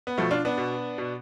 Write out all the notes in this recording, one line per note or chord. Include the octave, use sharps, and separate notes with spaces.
B3
B2 F3 A3
D4 F4
B3 D4
B2
B2